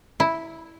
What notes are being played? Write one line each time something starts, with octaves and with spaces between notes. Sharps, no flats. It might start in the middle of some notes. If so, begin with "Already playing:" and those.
E4